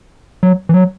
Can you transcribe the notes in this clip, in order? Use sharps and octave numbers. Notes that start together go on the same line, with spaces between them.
F#3
E3
F#3